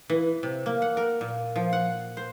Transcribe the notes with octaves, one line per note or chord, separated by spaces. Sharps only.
E3
C3
A#3
F#5
A#4
A#2
F3
F#5
C5